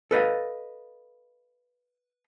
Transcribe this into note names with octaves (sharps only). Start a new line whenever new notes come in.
A4 B4 D#5 F5